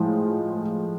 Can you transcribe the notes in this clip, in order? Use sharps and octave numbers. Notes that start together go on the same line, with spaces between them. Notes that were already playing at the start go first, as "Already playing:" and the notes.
Already playing: A2 F3 G#3